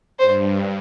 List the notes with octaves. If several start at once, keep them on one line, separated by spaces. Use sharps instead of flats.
G2 C5